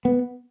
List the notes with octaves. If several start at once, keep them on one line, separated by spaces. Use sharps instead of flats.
B3